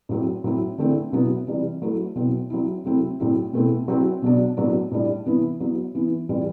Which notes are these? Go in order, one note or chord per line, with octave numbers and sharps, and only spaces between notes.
A2 F#3 C4
A2 F#3 C4 E4
D3 A3 C4 E4
B2 F#3 B3 E4
C3 E3 G3
F#3 A3 E4
B2 F#3 C4 E4
F#3 C4 E4
C3 F#3 A3 C4 E4
A2 F#3 C4 E4
B2 A3 C4 E4
F#3 C4 E4
B2 F#3 B3 D4
A2 F#3 B3 D4
A2 G3 D4
C3 E3 B3 E4
F#3 B3 E4
E3 B3 E4
A2 E3 G3 C4